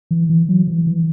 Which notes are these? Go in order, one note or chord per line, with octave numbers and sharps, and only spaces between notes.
E3
E3
F#3
E3
E3